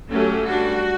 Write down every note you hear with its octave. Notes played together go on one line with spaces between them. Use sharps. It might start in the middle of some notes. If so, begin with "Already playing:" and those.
F#3 A3 C#4 G4
G3 D4 F#4